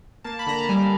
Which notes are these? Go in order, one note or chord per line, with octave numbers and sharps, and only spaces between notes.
A#3 A5
B5
D3 A#5
A5
G3 G#5